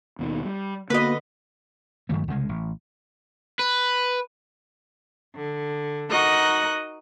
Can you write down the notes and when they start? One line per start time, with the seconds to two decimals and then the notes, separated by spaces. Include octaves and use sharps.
0.19 D#2 B2 D#3
0.45 G3
0.90 D3 A#3 B3 F#4 B4 D#5
2.09 G2 D#3 F#3 A3
2.28 C2 C#3 G#3
2.49 A1
3.59 B4
5.36 D3
6.10 D#4 F#4 A#4 D#5 F#5 F#6